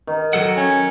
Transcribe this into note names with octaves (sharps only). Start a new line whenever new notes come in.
D#3
F#3 A4 F#5
C#4